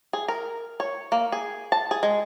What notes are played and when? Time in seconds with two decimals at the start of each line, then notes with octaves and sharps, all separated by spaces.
0.13 G#4
0.28 A#4
0.80 C#5
1.12 A#3
1.32 G#4
1.72 A5
1.91 G#4
2.03 G#3